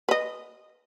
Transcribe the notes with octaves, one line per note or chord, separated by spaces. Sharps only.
B4 D#5